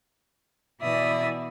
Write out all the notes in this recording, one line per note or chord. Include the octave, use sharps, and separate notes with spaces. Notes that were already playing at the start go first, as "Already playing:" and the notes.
B2 E3 D5 E5 D#6